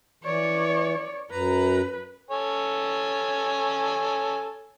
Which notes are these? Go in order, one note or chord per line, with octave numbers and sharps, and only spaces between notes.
E3 C#5 D5
F#2 B4 A#5
A4 C#5 G#5